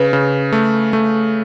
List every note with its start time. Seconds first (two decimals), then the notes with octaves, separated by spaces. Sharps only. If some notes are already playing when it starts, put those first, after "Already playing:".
Already playing: C#3 B4
0.13 C#3
0.52 A3
0.93 A3